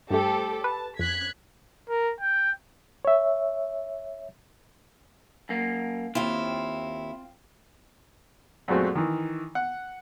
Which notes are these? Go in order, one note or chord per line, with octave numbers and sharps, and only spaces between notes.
G2 A3 G4 A4 C5
B4 A5
F2 F#6 G#6 B6
A#4
G5
C#5 E5
F#2 A#3
D#2 C4 E4 F4
F#2 A#2 G#3 A3 C4 F#4
D#3 E3
F#5